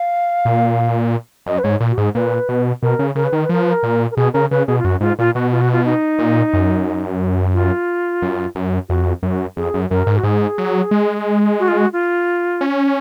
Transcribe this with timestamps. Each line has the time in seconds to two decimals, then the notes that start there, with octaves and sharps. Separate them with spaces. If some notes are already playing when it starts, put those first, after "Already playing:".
Already playing: F5
0.45 A#2
1.46 F#2 D#5
1.58 B4
1.64 G#2 C#5
1.80 A#2
1.91 F#4
1.97 G#2 G#4
2.14 A#2 B4
2.49 B2
2.82 B2 A#4
2.99 C#3
3.15 C#3 A#4
3.24 B4
3.33 D#3 A#4
3.43 B4
3.49 F3 A#4
3.62 B4
3.71 A#4
3.83 A#2
4.11 A#4
4.16 B2 G#4
4.33 C#3 A#4
4.51 C#3 B4
4.67 B2 G#4
4.78 F4
4.84 F#2 F#4
5.01 G#2 F4
5.19 A#2 F4
5.35 B2 F#4
5.52 F4
5.61 F#4
5.72 F4
5.85 D#4
6.19 A#2
6.53 F#2
7.54 F4
8.22 F#2
8.55 F#2
8.89 F2 F#4
9.23 F#2 F#4
9.56 F2 G#4
9.74 F#2
9.90 F#2 A#4
10.07 G#2
10.17 F#4
10.23 G#2 G#4
10.58 F#3
10.91 G#3
11.60 F#4
11.68 F4
11.78 F#4
11.93 F4
12.61 C#4